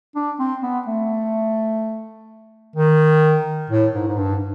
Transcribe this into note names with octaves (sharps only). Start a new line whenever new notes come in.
D4
C4
B3
A3
D#3
A2
G#2
G#2
G2